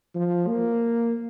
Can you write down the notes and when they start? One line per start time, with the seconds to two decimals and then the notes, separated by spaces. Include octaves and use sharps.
0.15 F3
0.48 A#3